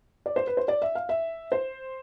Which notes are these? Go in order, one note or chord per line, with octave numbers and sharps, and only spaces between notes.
D5
C5
B4
C5
D5
E5
F5
E5
C5